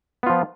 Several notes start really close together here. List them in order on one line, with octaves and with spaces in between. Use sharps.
B3 F4 F3